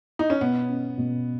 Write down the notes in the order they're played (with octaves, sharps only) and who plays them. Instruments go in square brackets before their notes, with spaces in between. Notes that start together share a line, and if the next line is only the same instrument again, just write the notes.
[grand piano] D#4
C#4
[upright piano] B2 [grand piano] B3
[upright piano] C#4
B2